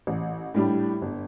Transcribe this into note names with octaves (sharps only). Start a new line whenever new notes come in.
A1
A2 G3 D4 G4
G1